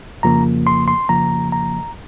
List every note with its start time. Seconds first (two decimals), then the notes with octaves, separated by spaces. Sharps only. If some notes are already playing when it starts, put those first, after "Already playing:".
0.23 F2 C#3 F3 A#3 A#5
0.67 C6
0.88 C6
1.09 F2 C#3 F3 A#3 A#5
1.52 A#5